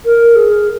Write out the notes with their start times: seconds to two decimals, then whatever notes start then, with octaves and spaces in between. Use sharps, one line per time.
0.05 A#4
0.36 G#4